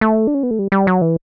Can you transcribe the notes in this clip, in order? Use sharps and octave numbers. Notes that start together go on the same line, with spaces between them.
A3
D4
C#4
B3
A3
G3
G3
F#3
E3